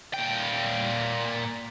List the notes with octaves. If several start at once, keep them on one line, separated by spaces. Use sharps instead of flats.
A#2 G5